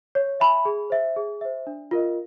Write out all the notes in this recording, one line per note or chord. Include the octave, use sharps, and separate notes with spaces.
C#5
E5 G#5 B5
G#4
C5 E5
G#4
C5 E5
D4
F4 A#4 D#5